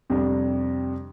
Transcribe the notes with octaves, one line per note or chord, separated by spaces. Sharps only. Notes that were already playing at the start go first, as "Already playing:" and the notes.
F2 C3 G3 D4